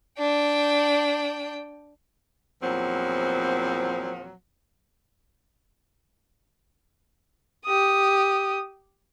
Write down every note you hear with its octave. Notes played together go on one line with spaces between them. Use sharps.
D4 G5
E2 A#2 F3 F#3 C4
G4 D#6